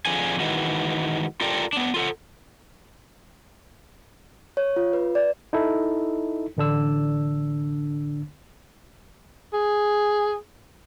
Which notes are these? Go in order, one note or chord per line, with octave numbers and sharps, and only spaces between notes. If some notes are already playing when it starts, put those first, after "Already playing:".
F2 D3 F3 D4 G#4 G#5
D#3 E3 G#3 F#4
F4 G4 A4 A#4 D5 G5
B3 D4
F4 A4 F#5
C#5
F4
B4
D5
D#4 E4 A4
A1 D3 D4 E6
G#4